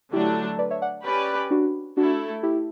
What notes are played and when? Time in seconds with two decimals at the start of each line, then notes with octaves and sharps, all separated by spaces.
0.12 D3 F#3 A3 D4 E4 G4
0.58 B4 D5
0.70 C#5 E5
0.82 D5 F#5
1.04 C#4 G4 B4 D5
1.51 D4 F#4
1.97 A3 D4 E4 F#4 A4
2.43 E4 G4